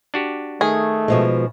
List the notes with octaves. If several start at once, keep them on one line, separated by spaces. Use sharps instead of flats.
D4 F#4 G4
D#3 A3 G#4
B2 F3 G#3